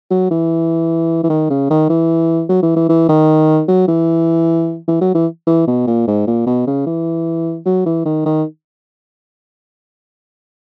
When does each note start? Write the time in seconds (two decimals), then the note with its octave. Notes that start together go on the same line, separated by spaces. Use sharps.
0.11 F#3
0.31 E3
1.24 E3
1.30 D#3
1.50 C#3
1.70 D#3
1.90 E3
2.49 F#3
2.63 E3
2.76 E3
2.89 E3
3.09 D#3
3.68 F#3
3.88 E3
4.88 E3
5.01 F#3
5.15 E3
5.47 E3
5.67 B2
5.87 A#2
6.07 G#2
6.27 A#2
6.47 B2
6.67 C#3
6.87 E3
7.66 F#3
7.86 E3
8.05 D#3
8.26 D#3